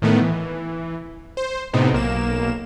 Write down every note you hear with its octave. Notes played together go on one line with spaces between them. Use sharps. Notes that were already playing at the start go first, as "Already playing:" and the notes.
A2 D#3 A3 B3
E3
C5
A2 C3 B3 C4 D#4
B1 A#3 E7